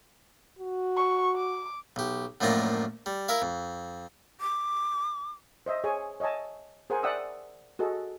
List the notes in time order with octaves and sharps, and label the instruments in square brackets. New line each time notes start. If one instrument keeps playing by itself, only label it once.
[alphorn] F#4
[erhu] C#6
D6
[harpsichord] B1 G4
F#2 A2 F3 A#3 D4 A#5
G3
E4 A#4 E5 F5
F2
[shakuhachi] D6
[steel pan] C5 D#5 E5
G#4 C#5 G#5
C#5 D#5 E5 G#5 A5
G#4 A#4 C5 F#5 G#5
D5 E5 F#5 G5 D#6 E6
F#4 G#4 A4 D#5